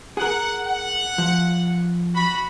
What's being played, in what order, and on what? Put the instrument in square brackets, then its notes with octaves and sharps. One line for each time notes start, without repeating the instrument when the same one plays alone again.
[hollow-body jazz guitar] G#4 A#4 [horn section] F#5
[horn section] F#5
[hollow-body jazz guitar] F3
[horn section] F#4 B5